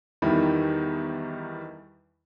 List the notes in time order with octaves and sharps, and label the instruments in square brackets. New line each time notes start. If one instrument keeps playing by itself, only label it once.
[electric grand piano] E2 D#3 G3 D#4 E4 B5